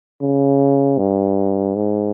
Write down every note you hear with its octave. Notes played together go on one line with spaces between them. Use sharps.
C#3
G2
G#2